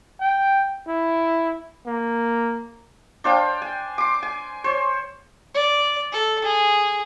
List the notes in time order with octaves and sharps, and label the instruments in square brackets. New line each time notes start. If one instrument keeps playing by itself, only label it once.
[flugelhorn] G5
E4
A#3
[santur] D4 C5 F5 G5
G#5
C6 D6
G#5
C5 C#5
[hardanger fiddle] D5
A4
G#4